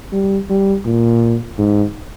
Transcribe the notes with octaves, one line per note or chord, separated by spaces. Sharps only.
G3
G3
A#2
G#2